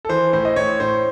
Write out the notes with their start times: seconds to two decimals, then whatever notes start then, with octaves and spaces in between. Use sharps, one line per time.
0.05 A4
0.09 E3 C5
0.33 A2 C5
0.45 D#5
0.56 A2 C#5
0.80 A2 C5